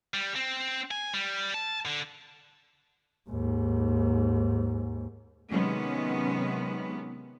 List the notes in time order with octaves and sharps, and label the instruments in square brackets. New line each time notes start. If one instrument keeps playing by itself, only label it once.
[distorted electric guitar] G3
C4
G#5
G3
A5
D3
[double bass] D#2 G#2
[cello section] C3 D#3 F#3 G#3 B3 C#4